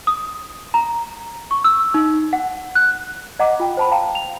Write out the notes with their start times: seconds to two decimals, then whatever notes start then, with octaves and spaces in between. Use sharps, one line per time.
0.07 D#6
0.74 A#5
1.51 C#6
1.64 E6
1.94 D#4
2.33 F#5
2.75 F#6
3.39 D#5 F#5 A#5 D6
3.60 F4 G5
3.77 C5 A5 B5
3.91 F5 G5 A5 A#5
4.15 F7